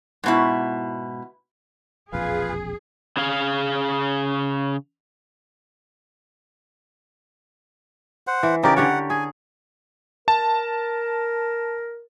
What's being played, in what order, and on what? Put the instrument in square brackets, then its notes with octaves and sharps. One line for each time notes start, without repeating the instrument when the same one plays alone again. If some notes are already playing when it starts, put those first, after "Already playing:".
[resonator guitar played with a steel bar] G#2 B2 E4
[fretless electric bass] E1 A#1 F2 [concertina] F4 B4 F5 [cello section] G#4
[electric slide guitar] C#3 G#4 F5
[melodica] C5 F#5
[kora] E3
[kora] C#3 A#4 D5 [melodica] D#4 G4
[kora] D3 G4 C#5 [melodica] F#5
[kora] G#4 [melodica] G#5
[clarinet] A#4 [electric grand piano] A5